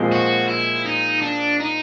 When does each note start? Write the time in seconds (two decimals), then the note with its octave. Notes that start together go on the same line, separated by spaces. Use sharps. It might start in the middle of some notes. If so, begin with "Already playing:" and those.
Already playing: A#2 F3 G#3 C4
0.12 F#4
0.48 E4
0.85 D#4
1.22 D4
1.60 D#4